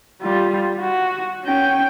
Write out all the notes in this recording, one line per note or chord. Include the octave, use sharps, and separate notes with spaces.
G3 F4
F#4
C#4 G5